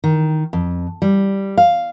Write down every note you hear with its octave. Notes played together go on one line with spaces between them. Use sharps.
D#3
F2
G3
F5